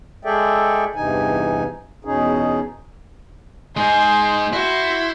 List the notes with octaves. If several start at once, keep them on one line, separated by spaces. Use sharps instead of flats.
G#3 G#4 A4 D5 E5 G5
E2 G2 C3 E3 D#4 G#5
E2 B2 C#4 D#4 G#4
G#3 D#4 G#4 C5
E4 F#4 C5